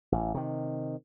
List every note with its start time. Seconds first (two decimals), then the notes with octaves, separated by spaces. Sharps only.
0.12 A1
0.34 C3 D#3